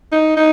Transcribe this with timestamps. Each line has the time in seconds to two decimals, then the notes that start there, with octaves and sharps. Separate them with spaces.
0.12 D#4
0.37 D#4